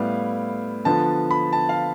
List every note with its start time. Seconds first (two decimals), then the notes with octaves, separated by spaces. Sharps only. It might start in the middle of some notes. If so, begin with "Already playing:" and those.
Already playing: A2 G3 B3 E4 F5
0.85 D3 F3 B3 A5
1.31 B5
1.53 A5
1.69 F5